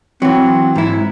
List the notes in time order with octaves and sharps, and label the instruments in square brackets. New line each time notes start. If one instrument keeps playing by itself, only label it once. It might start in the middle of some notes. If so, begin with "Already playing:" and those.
[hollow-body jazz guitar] E3 F#3 [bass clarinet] C4
[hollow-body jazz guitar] G#2 E4